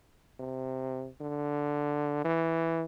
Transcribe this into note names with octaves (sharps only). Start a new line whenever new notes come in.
C3
D3
E3